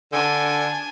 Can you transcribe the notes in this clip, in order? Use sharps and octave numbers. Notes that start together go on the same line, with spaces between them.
D3 D4 G#5